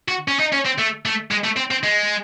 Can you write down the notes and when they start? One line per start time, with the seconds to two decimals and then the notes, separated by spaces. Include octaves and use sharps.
0.08 F#4
0.28 C#4
0.39 D#4
0.52 C#4
0.65 C4
0.78 A3
1.05 A3
1.31 G#3
1.44 A3
1.57 C4
1.71 C4
1.84 G#3